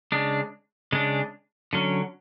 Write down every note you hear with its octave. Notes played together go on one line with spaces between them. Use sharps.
C#3 G#3 D4
C#3 G#3 D4
D3 F#3 C#4